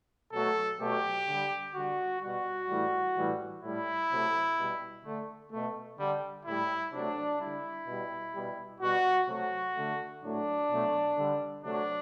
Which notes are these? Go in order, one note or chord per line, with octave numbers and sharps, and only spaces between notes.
B2 F#3 A3 A4
B2 F#3 A3 G4
D3 G3
D3 G3 F#4
B2 G3 F#4
A2 E3 G3
A2 E3 G3
A2 G3 E4
C3 F#3 A3
B2 G3
D3 A3
B2 A3
D3 G3
A2 G3 E4
C3 F#3 A3 D4
D3 G3 E4
B2 G3
B2 G3
B2 G3 F#4
C3 F#3 A3 F#4
D3 A3
A2 F#3 A3 D4
B2 F#3 A3
D3 G3
C3 F#3 A3 D4